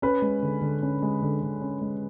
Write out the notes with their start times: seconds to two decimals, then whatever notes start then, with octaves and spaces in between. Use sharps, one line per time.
0.02 C#4 B4
0.22 G#3
0.43 D3
0.62 D3
0.83 C#4
1.02 G#3
1.22 D3
1.42 D3
1.61 C#4
1.81 G#3